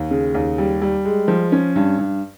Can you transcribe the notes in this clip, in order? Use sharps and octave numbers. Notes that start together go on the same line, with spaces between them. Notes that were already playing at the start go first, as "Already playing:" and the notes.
Already playing: D#2
C#3
D#2
G3
G3
G#3
F3
C#4
G2
G2